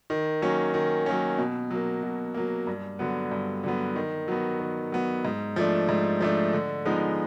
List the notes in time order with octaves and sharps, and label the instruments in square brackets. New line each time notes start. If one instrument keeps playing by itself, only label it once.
[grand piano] D#3
F#3 A#3 C#4
D#3
F#3 A#3 C#4
B2
F#3 A#3
B2
F#3 A#3
G2
D3 F#3 B3
G2
D3 F#3 B3
D#3
F#3 B3
D#3
F#3 B3
G#2
F3 A3 D4
G#2
F3 A3 D4
D3
F3 G#3 B3 D#4